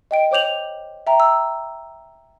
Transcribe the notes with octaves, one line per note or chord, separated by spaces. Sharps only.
D#5 G5 D7
C5 C#5 D6 G6 F7 F#7
E5 G5 A#5
E6